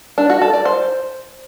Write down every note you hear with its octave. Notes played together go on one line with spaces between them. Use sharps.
D4
F#4
A4
D5
C5